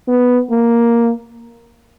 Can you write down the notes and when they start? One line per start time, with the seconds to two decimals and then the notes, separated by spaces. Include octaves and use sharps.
0.08 B3
0.51 A#3